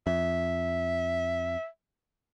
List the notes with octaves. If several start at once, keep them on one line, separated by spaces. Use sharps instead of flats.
F2 E5